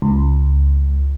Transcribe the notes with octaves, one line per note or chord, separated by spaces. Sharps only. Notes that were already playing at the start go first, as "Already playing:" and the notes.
C#2